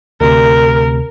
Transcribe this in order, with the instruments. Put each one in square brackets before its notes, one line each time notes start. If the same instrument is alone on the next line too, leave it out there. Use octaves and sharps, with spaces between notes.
[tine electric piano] D2 C3 [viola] A#4